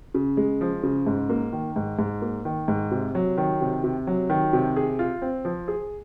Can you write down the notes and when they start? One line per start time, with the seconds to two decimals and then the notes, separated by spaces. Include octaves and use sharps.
0.14 C#3
0.37 G#3
0.61 F3
0.83 C#3
1.07 G#2
1.29 A#3
1.53 D#3
1.76 G#2
1.99 G#2
2.22 A#3
2.45 D#3
2.68 G#2
2.91 C3
3.15 F#3
3.38 D#3
3.61 C3
3.84 C3
4.07 F#3
4.30 D#3
4.53 C3
4.76 G#4
4.99 F4
5.22 C4
5.45 F3
5.68 G#4